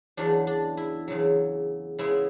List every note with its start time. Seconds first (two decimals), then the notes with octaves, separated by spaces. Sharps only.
0.17 E2 C#3 F#3 D4
0.47 D4
0.77 E4
1.08 E2 C#3 F#3
1.99 C#3 G#3 B3 E4